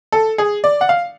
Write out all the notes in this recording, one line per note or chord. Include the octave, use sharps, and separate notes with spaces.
A4
G#4
D5
F#5
F5